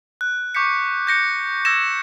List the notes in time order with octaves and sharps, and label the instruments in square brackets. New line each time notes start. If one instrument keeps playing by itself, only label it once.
[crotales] F#6
C#6 D6 G6 B6 C#7
G6 A#6 C#7
E6 G#6 A#6 E7